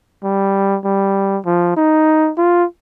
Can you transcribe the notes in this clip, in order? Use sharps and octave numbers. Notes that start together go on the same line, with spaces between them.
G3
G3
F3
D#4
F4